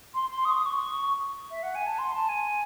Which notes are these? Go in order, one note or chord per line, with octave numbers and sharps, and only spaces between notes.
C6
C6
D#6
C#6
D#6
C#6
C#6
E5
F#5
G#5
A5
C6
A5
G#5